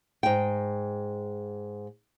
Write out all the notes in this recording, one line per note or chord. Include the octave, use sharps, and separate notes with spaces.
G#2 G5